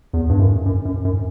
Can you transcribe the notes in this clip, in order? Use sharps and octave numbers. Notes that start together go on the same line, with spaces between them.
E2
G2
F#2
F#2
F#2
F#2